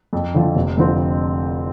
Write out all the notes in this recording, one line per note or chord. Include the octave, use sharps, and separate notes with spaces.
F2
D3 F3
F1
F2 D3 F3 C4